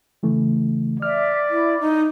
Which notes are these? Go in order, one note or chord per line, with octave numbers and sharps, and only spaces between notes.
C#3 E3 A3
D5 E5 F6
E4
D#4